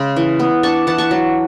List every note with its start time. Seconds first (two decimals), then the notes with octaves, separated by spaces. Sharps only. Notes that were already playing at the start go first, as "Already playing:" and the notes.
Already playing: C#3 G#3
0.16 E3
0.39 B3
0.63 D4 A5 C#6
0.87 E3 F#5 A5
0.98 A5 C#6
1.11 F#3